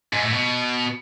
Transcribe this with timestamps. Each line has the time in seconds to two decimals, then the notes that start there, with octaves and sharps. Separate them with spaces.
0.13 G#2
0.23 A2
0.33 B2